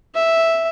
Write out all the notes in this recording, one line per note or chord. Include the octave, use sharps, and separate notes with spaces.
E5